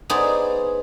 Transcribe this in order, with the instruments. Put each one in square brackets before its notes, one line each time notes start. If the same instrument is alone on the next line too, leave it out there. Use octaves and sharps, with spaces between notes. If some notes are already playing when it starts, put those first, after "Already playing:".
[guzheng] B3 D#4 G#4 C5 D5